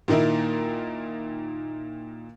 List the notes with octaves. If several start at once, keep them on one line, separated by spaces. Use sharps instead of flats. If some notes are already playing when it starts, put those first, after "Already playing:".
A#2 D#3 A#3 D#4 E4